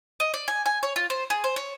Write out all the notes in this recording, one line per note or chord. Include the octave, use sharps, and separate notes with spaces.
D#5
D5
G#5
G#5
C#5
F4
C5
G#4
C5
C#5